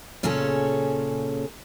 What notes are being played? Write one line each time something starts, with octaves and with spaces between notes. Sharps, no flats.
A#2 C#3 C#4 G#4 A4 C#5